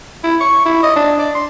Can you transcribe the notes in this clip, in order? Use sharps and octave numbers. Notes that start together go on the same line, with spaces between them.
E4
C#6
E4
D#5
D4
D5
C6